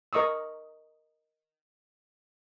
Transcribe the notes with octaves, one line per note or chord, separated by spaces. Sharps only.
A#4 D#5 C#6 D#6 E6